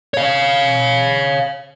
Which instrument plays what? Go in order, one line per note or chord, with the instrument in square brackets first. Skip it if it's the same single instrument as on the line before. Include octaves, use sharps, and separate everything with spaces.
[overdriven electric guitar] C#5 F5